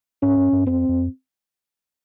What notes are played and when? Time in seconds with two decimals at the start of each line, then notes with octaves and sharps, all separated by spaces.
0.22 G#2 C#4
0.37 G2
0.53 G2
0.67 F2 C4
0.89 F2